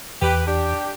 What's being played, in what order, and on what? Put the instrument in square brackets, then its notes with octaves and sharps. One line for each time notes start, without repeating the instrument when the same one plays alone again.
[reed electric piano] E2 [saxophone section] G4 B4
[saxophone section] D4 G4